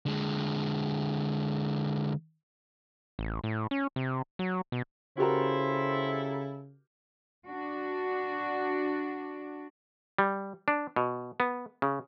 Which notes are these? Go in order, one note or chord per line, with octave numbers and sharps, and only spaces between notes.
D3 G#3
A1
A2
C#4
C3
F#3
B2
C#3 E4 F#4 G4 A4 A#4 C5
D4 F#4
G3
D4
B2
B3
C#3